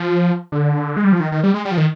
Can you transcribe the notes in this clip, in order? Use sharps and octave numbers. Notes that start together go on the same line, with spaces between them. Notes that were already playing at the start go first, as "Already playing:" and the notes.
Already playing: F3
D3
G#3
G3
F3
D#3
D#3
G3
G#3
G3
F3
D#3